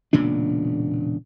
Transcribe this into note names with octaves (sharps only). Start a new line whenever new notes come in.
E1 A#2 C#3 D4